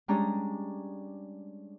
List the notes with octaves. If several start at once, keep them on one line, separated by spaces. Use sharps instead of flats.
G3 G#3 C#4 D4 A#5